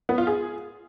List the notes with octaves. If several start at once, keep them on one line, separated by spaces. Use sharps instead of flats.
B3
F4
G#4